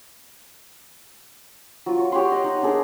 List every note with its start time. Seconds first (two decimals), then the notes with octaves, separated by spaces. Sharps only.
1.86 F#3 F4
1.99 C#6
2.12 G4 C#5 F#5 C6
2.32 D#5 F#5
2.44 D#4
2.63 D4 D#4 G#4 A#4